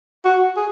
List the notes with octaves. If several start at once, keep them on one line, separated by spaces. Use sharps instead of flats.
F#4
G#4